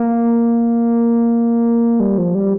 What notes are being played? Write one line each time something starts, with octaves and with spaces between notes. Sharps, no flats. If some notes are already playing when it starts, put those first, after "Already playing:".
Already playing: A#3
G3
F3
G3